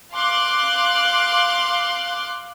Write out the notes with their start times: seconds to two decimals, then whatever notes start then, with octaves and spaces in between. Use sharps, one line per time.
0.14 F5 C6 D6 F#6